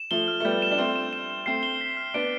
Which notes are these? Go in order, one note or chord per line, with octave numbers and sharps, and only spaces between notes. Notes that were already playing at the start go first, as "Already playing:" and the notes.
Already playing: E7
F3 A3 G7
F6
A3
G3 B3 G6
E7
D4
A3 C4 E7
E7
E7
E7
A3 C4 C7
G7
B6
F6
B3 D4 D7